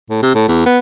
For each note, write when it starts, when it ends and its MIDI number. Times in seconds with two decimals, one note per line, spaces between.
0.10 0.21 45
0.22 0.34 48
0.35 0.48 45
0.48 0.61 40
0.66 0.78 59